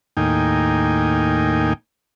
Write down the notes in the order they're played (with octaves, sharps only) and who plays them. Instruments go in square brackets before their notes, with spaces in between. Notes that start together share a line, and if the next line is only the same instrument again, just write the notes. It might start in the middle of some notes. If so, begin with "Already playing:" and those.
[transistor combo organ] D#2 A2 A#3 D#4 G5 G#5